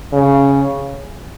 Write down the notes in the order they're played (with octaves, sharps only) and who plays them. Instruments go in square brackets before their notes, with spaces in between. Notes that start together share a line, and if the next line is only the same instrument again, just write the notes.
[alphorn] C#3